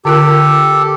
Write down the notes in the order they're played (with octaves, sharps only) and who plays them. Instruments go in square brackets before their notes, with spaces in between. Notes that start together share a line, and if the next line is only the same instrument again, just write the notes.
[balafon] D3 F4 A#4 [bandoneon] G4 A4